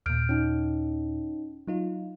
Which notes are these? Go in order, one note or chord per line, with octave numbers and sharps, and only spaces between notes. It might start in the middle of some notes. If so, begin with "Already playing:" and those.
D#2 A#2 F6 G6 D7
C#4 D#4
F#3 D#4 F4